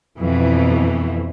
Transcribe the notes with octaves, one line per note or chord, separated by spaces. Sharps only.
F2 B2 E3